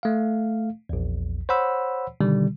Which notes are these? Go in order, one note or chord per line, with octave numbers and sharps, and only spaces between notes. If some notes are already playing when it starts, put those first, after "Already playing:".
A3 F5
A#1 E2
C5 C#5 F#5 B5 E6
B2 D3 D#3 G3